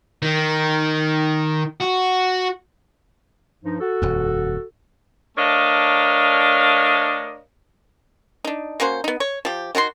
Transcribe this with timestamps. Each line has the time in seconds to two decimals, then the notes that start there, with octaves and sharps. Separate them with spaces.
0.22 D#3
1.81 F#4
3.64 G2 F3 D#4
3.81 F#4 A4
4.02 D#1 F2
5.38 A3 D4 A#4 C#5 D#5 F5
8.45 D4 D#4
8.80 A#3 C#4 F#4 C5
9.04 B3 D#4
9.20 C#5
9.45 F3 G4
9.75 D#3 F#4 G4 C6